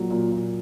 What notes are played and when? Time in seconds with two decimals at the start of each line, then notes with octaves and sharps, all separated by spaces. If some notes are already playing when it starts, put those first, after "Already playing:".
Already playing: A#2 F#3
0.10 A#2
0.32 A#2